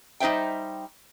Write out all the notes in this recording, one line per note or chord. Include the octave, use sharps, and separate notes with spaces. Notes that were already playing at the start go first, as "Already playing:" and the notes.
G3 D#4 C5 E5 G5